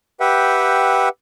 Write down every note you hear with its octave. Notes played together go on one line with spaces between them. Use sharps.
G4 B4 E5 F#5 G5